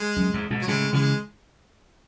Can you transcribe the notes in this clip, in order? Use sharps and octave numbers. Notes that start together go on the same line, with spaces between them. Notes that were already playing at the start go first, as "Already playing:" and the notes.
Already playing: G#3
F#2
E2 G#2
G#2 B2
F#3
A2 C#3 G#3
C#3 E3 G#3